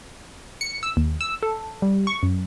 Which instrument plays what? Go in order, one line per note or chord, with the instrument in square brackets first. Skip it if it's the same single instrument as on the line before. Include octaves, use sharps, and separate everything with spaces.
[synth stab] C#7
E6
D#2
E6
A4
G3
C#6
F#2